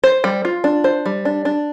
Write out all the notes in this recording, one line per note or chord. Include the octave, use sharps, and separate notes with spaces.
C5
G3
F4
D4
C5
G3
D4
D4